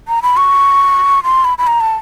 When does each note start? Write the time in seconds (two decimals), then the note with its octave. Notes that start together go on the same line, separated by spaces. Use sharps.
0.08 A#5
0.22 B5
0.37 C#6
1.24 C6
1.44 B5
1.58 B5
1.67 A#5
1.81 A5